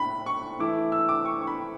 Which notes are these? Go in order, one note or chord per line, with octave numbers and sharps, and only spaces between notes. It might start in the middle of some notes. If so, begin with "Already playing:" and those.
Already playing: A2 B5
C#6
E3 A3 E4 D6
E6
D6
C#6
C#6
B5